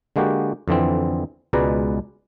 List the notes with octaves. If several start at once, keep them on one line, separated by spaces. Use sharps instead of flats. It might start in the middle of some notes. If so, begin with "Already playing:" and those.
D3 G#3 A#3 F#4 G4
F2 D3 E3 C4
C#2 B2 G#3 B4 D5 A#5